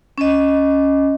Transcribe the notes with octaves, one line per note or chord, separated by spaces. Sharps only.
C#4 D#5